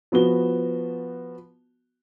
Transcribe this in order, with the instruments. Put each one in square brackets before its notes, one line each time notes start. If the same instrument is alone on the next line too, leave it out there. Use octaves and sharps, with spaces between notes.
[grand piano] F3 B3 F#4 G7